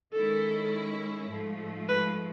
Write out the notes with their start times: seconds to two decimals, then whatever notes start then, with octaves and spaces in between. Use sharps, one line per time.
0.13 D#3 G#3 C#4 E4 A4
1.30 G#2 F3 A3
1.89 B4